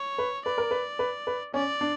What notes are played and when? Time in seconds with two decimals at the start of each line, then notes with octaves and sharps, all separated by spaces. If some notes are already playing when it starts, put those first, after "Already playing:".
Already playing: C#5
0.18 B4
0.45 B4 D5
0.58 A#4
0.71 B4
0.99 B4
1.27 B4
1.54 C#4 D5
1.81 D4